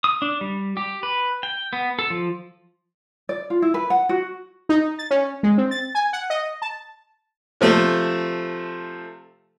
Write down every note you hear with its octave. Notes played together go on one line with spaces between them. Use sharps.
D#6
D4
G3
G4
B4
G5
B3
A4
F3
D5
F4
E4
B4
F#5
F#4
D#4
A6
C#4
G#3
C4
A6
G#5
F#5
D#5
A5
C3 F3 A3